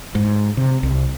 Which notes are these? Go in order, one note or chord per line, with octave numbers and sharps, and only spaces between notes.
G#2
C3
C2